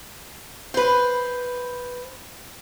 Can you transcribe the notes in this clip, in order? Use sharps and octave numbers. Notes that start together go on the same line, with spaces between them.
B4 C5